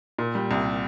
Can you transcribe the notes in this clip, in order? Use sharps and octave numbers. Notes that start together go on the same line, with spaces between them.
A#2
G3
C2